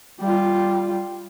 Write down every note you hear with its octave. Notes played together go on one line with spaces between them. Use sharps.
G3 F4